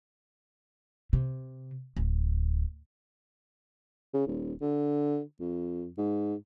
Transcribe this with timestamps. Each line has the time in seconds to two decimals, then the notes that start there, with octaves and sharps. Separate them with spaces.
1.13 C3
1.96 D1
4.14 C#3
4.28 D#1
4.62 D3
5.40 F2
5.98 G#2